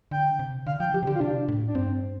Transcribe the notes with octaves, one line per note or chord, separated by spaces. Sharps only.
D3 G5
C3
D3 F5
F3 G5
F3 G4
C3
D3 G4
F4
C3 D4
A2
D4
G2 C4